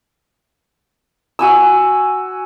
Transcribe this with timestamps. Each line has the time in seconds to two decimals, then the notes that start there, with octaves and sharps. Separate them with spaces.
1.39 F#4 G#5 E6